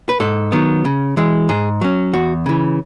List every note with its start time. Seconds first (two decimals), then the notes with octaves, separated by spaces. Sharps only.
0.09 B4
0.20 G#2 A4
0.52 D#3 F#3 B3
0.85 C#3
1.17 E3 G#3
1.49 G#2 G#4
1.81 F#3 C#4
2.13 E2 F#4
2.46 C#3 E3